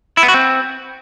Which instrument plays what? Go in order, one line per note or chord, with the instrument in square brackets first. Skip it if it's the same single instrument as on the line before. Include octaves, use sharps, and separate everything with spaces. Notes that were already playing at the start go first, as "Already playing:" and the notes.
[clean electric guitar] E4
B3
F#4
C4